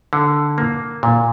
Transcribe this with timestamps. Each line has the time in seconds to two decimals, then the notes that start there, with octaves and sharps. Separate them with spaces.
0.13 D3
0.58 A#3
1.03 A#2